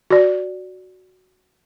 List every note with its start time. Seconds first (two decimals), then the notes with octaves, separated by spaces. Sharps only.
0.10 F#4 D5